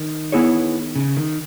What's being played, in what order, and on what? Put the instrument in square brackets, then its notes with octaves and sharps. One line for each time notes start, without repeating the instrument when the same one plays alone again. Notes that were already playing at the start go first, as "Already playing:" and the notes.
Already playing: [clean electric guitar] D#3
[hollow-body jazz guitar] B3 E4 G#4 C#5
[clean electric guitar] C#3
D#3